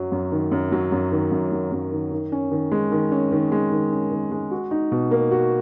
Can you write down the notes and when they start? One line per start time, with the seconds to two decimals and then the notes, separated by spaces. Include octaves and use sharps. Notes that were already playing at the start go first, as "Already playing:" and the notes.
Already playing: F#2 F#3
0.12 F#2
0.32 D#3
0.52 F#2
0.72 F#3
0.92 F#2
1.12 D#3
1.32 F#2
1.52 F#3
1.72 F#2
1.92 D#3
2.11 D#3
2.32 C#4
2.52 D#3
2.72 G#3
2.92 D#3
3.12 C#4
3.32 D#3
3.52 G#3
3.71 D#3
3.91 C#4
4.12 D#3
4.32 G#3
4.51 F#4
4.71 D#4
4.92 B2
5.11 A#3
5.31 F#4